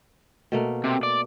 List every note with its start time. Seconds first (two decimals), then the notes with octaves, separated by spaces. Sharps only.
0.52 B2 A3 A#3
0.84 C3
1.03 D5